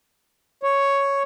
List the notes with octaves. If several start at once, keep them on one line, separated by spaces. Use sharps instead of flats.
C#5